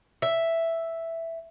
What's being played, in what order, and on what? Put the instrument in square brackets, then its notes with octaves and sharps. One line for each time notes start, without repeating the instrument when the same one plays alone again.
[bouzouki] E5